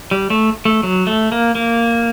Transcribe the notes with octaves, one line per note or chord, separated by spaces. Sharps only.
G3
A3
A3
F#3
A3
A#3
A#3